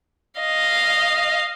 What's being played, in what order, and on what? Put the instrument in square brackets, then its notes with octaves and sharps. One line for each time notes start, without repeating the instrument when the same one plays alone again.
[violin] D#5 F5